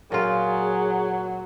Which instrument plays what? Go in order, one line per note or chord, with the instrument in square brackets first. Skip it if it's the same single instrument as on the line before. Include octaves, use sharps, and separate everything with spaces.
[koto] A#2 F4 [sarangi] F#3 [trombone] G#4